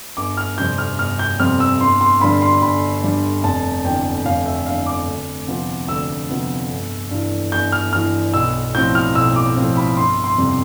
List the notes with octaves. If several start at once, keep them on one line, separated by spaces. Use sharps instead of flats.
G1 D6
F6
F2 C3 G3 C4 G6
F6
G1 F6
G6
F2 C3 G3 C4 F6
E6
G1 C6
C6
G2 D3 G3 B5
C6
G1 B5
G2 D3 G3
F1 A5
E2 D3 G5
F1 F5
E5
E2 D3 F5
D6
D2
C3 F3 B3 F4
D2 E6
C3 F3 B3 F4
G1
G2 E3
G1 G6
F6
G2 E3 F6
B1 E6
A2 F3 C4 G6
F6
B1 E6
D6
A2 F3 C4
B5
G1 C6
C6
F2 C3 G3